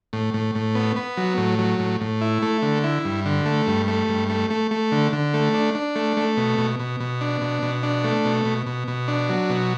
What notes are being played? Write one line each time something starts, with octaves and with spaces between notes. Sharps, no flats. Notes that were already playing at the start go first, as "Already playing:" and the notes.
A2
A2
A2
B3
B3
F#3
A2
F#3
A2
A2
E4
A3
D3
E4
G2
D3
A3
G2
A3
G2
A3
A3
A3
D3
D3
A3
D4
D4
A3
A3
B2
B2
B2
B2
D4
B2
B2
D4
A3
B2
B2
B2
B2
D4
F#3
B2